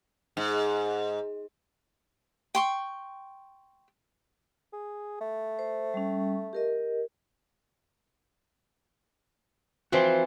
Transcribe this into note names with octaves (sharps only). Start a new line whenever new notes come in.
G#2
G5 C6 C#6
G#4
A3
C5
G3 C#4
G4 A#4 D#5
E3 F3 C4 F#4 C5